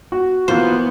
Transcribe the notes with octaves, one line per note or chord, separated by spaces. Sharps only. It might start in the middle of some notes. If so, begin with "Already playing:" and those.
F#4
E3 A#3 B3 F4 C5